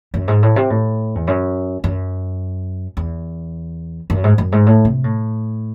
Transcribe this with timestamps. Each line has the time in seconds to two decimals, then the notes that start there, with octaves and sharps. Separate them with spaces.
0.14 F#2
0.28 G#2
0.43 A2
0.56 C3
0.70 A2
1.15 E2
1.27 F#2
1.84 F#2
2.97 E2
4.10 F#2
4.24 G#2
4.38 F#2
4.52 G#2
4.66 A2
4.85 C3
5.04 A2